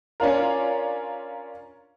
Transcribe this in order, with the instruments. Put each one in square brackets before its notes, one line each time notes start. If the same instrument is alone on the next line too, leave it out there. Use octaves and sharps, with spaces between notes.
[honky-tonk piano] C#4 D4 F4 A#4